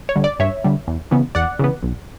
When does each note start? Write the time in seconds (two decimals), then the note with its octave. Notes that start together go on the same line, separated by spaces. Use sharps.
0.09 C#5
0.16 D3 G3
0.24 D5
0.39 G2 C#5 E5
0.64 D3 G3
0.87 E2
1.11 C#3 E3 B3
1.35 E2 D5 F#5
1.59 C#3 E3 B3
1.83 B1